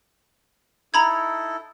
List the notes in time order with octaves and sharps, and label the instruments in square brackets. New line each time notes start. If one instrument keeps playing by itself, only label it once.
[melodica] D#4 E4 A4 [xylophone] A#5 B5 G#6